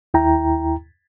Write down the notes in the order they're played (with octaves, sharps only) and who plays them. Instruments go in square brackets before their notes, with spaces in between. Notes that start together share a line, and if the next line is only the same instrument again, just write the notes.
[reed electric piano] D#2 E4 G5 A#5